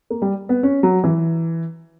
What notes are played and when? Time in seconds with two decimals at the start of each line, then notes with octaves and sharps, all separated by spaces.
0.10 A#3
0.22 G3
0.49 B3
0.63 C#4
0.83 F#3
1.04 E3